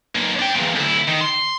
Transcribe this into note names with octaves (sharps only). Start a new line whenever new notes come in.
B1 A#3
D4 G5
E2 A#2
D2 E4
D#3
C6